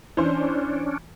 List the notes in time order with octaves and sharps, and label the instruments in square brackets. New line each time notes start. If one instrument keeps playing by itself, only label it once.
[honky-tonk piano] E3 C5 [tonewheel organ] C#4 D4